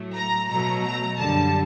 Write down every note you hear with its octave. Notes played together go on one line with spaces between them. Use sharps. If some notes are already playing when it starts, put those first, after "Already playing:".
Already playing: A2 F#3 A3
A#5
B2 F#3 A3 A#5
A#5
F#2 D3 G3 A5